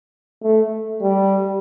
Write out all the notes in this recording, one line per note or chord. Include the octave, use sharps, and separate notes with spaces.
A3
G3